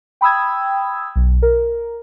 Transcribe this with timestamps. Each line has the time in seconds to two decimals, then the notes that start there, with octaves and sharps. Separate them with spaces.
0.21 G5 B5 D#6 E6 G#6
1.16 B1
1.42 A#4